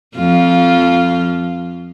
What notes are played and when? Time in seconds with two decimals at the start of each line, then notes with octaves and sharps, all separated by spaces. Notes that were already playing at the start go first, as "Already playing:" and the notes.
0.16 F2 F3 F4